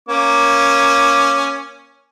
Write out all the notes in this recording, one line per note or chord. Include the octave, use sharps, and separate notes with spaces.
A#3 C#4 D6